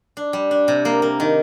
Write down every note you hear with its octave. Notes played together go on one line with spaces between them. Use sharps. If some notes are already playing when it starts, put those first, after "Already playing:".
D4
G3
D4
C3
A#3
A#3
D#3